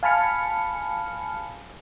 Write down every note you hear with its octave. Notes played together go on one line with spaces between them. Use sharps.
F5 G#5 A5 B5 F6 C#7